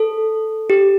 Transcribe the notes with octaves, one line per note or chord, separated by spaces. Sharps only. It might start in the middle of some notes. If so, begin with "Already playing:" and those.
Already playing: A4
G4